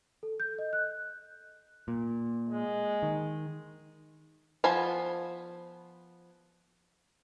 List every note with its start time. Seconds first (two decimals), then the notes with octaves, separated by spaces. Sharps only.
0.23 A4
0.40 G6
0.59 D#5
0.73 F#6
1.88 A#2
2.49 G#3
3.03 D#3
4.64 F3 B3 C5 G#5 B5